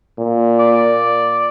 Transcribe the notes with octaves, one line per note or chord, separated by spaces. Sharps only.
A#2
D5